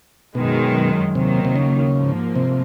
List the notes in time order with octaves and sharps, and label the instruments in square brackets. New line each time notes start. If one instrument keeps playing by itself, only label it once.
[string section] F#2 D#3 G#3 [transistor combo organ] B2
[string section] D#2 D#3 F#3 A#3 [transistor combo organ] C3
[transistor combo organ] C3
C#3
[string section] G#2 F3 A#3
[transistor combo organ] C3